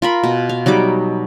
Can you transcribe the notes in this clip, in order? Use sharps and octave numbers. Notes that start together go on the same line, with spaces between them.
F4 A#4 B5
B2
F5
F#3 G3 D#4 D6